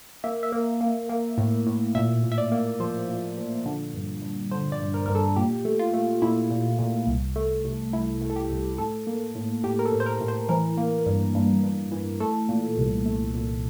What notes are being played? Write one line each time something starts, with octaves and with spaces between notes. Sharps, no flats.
A#3 E5
E5
A#3
A#3
A#3
A2
A2
A#2 E5
A#2
E5
D5
A#3
F3 C5
A#2
F3
D3
G2
G2
D3 C5
D5
G2
A#4
G2 A#4
A4
A#2 G4
A3
F4
A3
A#2 E4
A#2
A#2
C2
A3
C2
C2 E4
A3
A4
G4
C2
A2 A4
A#3
A2
A2 G4
A#4
A4
A2
C5
A#4
A2
C5
E3 A#4
A#3
G2
G2
G2
E3
A3 A4
A#2
C2
A3
A#2